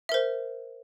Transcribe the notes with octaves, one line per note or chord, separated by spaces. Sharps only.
A#4 C5 E5